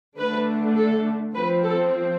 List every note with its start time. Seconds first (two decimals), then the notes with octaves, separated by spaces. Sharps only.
0.17 D3 A3 D4 B4
0.77 A4
1.35 F3 C4 B4
1.64 A4